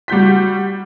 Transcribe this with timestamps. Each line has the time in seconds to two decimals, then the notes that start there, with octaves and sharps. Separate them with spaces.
0.08 G3 F#4 G6 B6